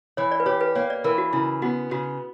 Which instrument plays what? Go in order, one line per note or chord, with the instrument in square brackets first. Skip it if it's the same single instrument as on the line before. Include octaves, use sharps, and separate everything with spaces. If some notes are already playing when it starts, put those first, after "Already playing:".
[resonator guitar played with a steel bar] E3 [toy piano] C#5
[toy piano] D5
B4
[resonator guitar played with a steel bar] G4 [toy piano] C#5
[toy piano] B4
[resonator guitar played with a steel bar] A#3 [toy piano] C#5
[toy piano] D5
[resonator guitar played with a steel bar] E3 [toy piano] A#4
[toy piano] F#4
[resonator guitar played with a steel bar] C#3 [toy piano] E4
[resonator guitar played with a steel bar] B3 [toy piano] F#4
[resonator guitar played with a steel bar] C#3 [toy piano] F#4